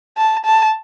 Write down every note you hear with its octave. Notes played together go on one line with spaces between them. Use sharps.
A5
A5